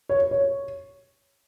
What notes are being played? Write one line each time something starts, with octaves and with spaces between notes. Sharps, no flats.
C#5
C#5